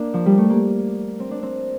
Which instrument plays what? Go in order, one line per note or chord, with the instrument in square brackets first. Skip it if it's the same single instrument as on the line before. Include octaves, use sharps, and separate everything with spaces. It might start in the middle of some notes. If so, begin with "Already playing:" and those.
Already playing: [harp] A#3 D4
F3
G3
A3
A#3
C4
D4
C4